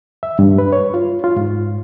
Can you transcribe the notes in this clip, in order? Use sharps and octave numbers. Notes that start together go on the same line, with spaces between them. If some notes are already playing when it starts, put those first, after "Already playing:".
E5
G2
B4
C#5
F4
F4
G#2